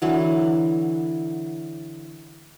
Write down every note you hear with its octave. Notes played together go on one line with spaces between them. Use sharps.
D3 E3 F#3